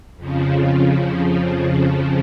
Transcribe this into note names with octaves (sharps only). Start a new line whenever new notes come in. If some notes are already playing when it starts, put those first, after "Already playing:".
F2 C#3 F3